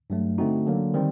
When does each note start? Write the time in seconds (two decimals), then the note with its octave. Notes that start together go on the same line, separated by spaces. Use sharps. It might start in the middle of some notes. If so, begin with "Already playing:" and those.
0.10 G2 F#3 A3
0.38 D3 A3 C4 D#4 F#4
0.66 D3 F#3 A#3
0.94 D#3 G3 C4